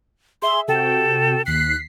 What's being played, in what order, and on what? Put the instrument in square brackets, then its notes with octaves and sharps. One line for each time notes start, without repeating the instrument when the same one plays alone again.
[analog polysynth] G#4 E5 [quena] C6
[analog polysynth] C3 F#4 G5 [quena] A4
[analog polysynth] D#2 B6 C7 [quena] F#6